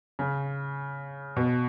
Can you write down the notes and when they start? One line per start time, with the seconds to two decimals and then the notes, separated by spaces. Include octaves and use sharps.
0.19 C#3
1.36 B2